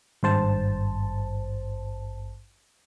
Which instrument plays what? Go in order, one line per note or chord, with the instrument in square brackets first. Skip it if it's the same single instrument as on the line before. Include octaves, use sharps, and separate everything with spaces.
[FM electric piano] G#1 G2 C5 A5